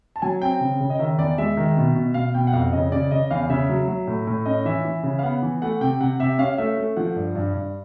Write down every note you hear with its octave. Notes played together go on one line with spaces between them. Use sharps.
A5
F#3 G#5
C4 G5
C#3
C#3
D#5
D#3 E5
E2 D5
G#3 E5
D#3
B2
B2
B2 F5
B2 G5
F#5
F2 F5
C#3 D#5
C#3 D5
C#3 D#5
E2 F5
C#3 E5
F#3
F#3
A2
A2
C#4 D#5
E3 E5
E3
C#3
F5
B3 F#5
E3
A3 F#5
C3 G5
C3 F#5
C3 E5
C#4 F5
A3 E5
A3
F3 F#5
G2
G2
G2